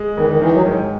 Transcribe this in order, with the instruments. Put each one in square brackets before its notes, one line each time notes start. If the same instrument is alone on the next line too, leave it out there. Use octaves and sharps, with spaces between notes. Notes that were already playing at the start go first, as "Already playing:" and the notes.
Already playing: [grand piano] G#3
[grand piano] E2 [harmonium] D#3
[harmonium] D#3
[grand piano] D#3 [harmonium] E3
[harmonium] F#3
[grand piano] G#2